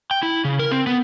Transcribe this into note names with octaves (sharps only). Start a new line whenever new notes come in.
G5
E4
C#3
A#4
C4
B3